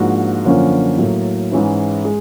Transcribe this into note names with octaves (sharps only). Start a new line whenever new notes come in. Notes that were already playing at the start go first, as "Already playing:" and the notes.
Already playing: G#2 F3 A#3 D4 F#4
F#2 D3 F3 A#3 C#4
A2 F#3 A#3
G#2 E3 G#3 C#4 E4
G#3